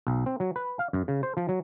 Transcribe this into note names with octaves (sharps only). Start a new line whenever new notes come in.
B1
C4
F#3
B4
F5
F#2
C#3
C5
F3
F#3